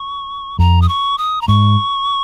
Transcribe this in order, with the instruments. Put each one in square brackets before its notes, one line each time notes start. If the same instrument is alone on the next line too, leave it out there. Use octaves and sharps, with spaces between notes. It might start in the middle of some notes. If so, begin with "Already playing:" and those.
Already playing: [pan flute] C#6
[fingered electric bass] F2 [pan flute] A#5
[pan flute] D#6
C#6
D#6
A#5
[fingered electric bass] G#2 [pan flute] C#6